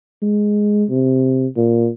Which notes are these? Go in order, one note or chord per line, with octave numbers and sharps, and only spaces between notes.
G#3
C3
A#2